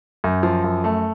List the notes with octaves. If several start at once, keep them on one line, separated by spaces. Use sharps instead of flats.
F#2
F3
F#2
A3